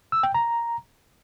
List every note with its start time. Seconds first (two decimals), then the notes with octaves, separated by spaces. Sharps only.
0.12 E6
0.23 G5
0.34 A#5